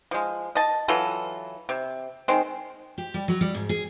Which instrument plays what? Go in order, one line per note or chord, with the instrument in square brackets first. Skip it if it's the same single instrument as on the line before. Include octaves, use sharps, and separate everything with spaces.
[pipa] F3 G#3
D#5 A5
E3 F#3 F4 A4
C3
D#3 G#3 C4
[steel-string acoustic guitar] G4
G3
F#3
G3
G#2
G#4